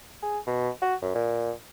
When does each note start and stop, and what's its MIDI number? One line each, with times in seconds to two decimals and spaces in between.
0.22 0.38 68
0.47 0.69 47
0.82 0.95 66
1.02 1.14 42
1.15 1.51 46